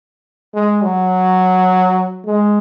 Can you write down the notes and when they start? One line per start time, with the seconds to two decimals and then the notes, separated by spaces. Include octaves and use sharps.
0.54 G#3
0.82 F#3
2.25 G#3